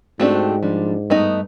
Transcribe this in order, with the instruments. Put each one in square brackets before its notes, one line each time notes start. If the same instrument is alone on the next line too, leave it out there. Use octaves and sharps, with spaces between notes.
[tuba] G#2 [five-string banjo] A3 C4 D4 [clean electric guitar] F#4 G4
[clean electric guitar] F3 D4 [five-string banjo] G3
[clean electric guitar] G2 [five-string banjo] A3 B3 D#4